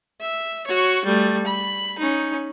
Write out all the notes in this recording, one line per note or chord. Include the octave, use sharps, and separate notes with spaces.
E5
F#4 C#5
G3 A3
B5
C#4 D#4